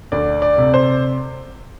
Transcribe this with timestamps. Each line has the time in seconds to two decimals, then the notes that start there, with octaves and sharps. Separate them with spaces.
0.12 D2 D5
0.42 D5
0.58 C3
0.74 C5